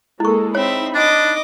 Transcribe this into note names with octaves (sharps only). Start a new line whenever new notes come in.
G#3 A#3 E4 A4 C#6
C4 D#4 C#5 E5 B5
D4 D#5 D6